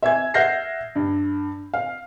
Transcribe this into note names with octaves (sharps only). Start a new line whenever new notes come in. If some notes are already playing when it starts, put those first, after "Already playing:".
E5 G#5 G#6
E5 F#5 F6 G6 A#6 C7
G2
F5